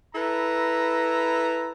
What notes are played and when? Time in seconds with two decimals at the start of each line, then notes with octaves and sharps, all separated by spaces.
0.15 E4 A4 B4 A#5